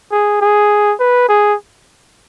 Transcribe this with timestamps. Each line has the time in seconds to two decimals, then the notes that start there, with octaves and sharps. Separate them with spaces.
0.12 G#4
0.41 G#4
1.00 B4
1.29 G#4